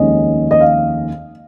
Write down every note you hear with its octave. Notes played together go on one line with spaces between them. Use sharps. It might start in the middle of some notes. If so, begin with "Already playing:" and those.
Already playing: F1 D#2 D#3 G#3 C#4 D#5
D#5
F5